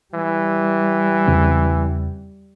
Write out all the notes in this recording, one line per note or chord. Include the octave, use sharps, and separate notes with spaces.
E3 G3
E2 C#3 C4